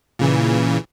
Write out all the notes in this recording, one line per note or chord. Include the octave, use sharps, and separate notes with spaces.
A#2 C#3 E3